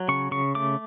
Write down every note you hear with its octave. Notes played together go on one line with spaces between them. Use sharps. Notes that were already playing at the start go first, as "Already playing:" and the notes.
Already playing: F#3
C#3 C#6
C#3 C#6
A3 D6